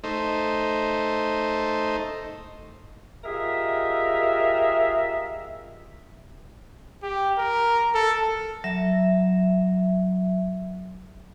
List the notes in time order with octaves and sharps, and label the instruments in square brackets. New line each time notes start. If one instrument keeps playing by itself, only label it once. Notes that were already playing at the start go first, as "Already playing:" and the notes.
[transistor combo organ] A3 D#4 C5
[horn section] F4 G4 G#4 A#4 D#5 E5
[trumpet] G4
A#4
A4
[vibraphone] F#3 E5